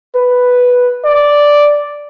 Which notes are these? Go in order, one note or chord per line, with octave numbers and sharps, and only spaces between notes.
B4
D5